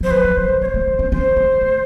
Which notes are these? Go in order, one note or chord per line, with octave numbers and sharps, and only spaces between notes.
F3 C5
F#3 B4
F#3
F#3 C5
G3
G#3 C#5
C5
A3
A#3
C#4
C#4 C5
G#3
A3